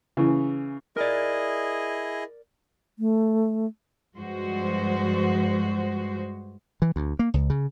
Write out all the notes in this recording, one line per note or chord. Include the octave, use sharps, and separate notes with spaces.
C#3 E3
E4 G#4 A#4 D5 D#5
A3
G2 F3 G#3 F#4 C5
E3
D2
A#3
C#2
C#3